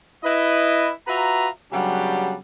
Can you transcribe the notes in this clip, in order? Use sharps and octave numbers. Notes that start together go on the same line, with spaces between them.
E4 B4 D#5
F4 F#4 B4 E5 A#5
C#3 F#3 G3 B3 D4 G4